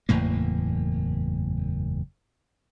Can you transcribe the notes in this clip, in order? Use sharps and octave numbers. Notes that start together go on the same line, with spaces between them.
F#1 E2 A2 A#3